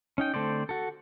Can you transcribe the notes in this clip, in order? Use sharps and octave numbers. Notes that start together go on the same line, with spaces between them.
C#4 D#4 G5
D3 A3 C4 C5 D5
F#4 A4